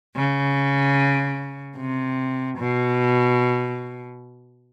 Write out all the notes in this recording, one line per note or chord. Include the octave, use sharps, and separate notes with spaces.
C#3
C3
B2